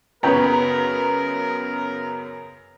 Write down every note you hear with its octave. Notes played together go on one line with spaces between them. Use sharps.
F#2 C#3 B3 A#4 B4 C#5 G5 A#5